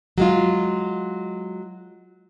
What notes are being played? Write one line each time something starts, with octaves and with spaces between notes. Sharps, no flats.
F#3 G#3 F4